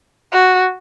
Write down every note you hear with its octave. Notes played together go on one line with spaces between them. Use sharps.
F#4